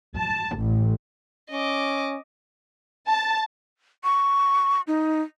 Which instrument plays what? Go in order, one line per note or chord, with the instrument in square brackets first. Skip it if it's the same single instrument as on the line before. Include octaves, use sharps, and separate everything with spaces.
[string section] A5
A1
[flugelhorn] C#4 [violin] D#5 D6
[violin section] A5
[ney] C#6
D#4